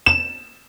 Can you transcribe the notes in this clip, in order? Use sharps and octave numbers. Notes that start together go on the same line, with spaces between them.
E7